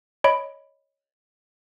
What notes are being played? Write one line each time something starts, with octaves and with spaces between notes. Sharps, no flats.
C#5 D#5 B5 D7